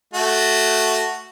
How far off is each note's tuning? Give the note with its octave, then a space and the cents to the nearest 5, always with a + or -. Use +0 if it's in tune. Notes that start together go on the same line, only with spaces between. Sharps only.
A3 +0 F#4 +0